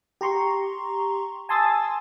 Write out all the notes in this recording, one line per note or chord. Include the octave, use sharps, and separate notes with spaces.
G4 A#5 C6 C#6
G#5 A5 C6 D#6 E6 A6